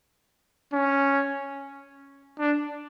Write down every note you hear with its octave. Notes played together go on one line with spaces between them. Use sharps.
C#4
D4